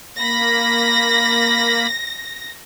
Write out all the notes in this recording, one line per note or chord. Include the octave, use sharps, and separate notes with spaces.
A#3 B5 A#6